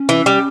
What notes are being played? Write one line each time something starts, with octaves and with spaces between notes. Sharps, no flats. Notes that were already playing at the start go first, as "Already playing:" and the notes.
Already playing: C#4
E3
G3